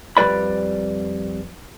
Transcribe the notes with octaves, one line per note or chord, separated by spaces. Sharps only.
F2 G3 B4 D5 B5